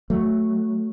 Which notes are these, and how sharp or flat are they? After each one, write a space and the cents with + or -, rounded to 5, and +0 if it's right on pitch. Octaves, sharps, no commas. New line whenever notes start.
F#3 +0 A3 +0